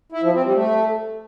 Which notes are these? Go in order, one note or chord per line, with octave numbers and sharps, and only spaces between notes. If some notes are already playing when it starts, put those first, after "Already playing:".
E4
F3
C4
G3
A3